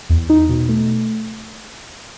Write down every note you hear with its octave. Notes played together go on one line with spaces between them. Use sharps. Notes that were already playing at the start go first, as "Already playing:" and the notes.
E2
D#4
B2
A3